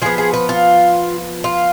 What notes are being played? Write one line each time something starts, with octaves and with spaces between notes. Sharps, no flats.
F3 B3 G#4
G#4
B4
F4
F4